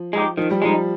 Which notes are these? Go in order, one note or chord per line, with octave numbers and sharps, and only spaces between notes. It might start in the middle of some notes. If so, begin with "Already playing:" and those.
Already playing: F3
G#3 D#4 G4
D#3 F3
G3
F3 G#3 D#4